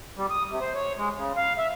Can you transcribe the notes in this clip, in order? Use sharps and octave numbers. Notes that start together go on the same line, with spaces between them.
G3
D#6
C3
C5
C#5
G#3
C#3
F5
E5